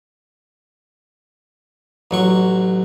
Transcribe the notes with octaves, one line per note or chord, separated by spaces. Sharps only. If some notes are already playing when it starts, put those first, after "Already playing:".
A1 F#3 C#6